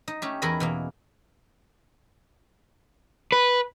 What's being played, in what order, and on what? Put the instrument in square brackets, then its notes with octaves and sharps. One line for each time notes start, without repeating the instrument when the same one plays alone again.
[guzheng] D#4
A3 C#4 G4
E2 E4 G#4 A#4 D#5 B5
B2 E3 A#3
[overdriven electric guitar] B4